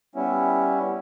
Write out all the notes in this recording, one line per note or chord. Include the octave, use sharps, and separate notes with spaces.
G3 B3 C#4 E4